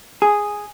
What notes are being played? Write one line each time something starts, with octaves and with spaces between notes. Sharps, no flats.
G#4